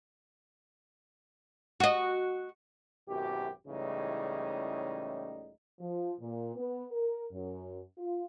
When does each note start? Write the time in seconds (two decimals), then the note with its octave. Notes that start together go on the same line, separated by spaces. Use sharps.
1.80 F#4 D#5
3.08 G#1 F#2 B2 E4 G4
3.68 C#2 A2 C#3 E3 G3 D#4
5.79 F3
6.20 A#2
6.55 B3
6.91 A#4
7.32 F#2
7.97 F4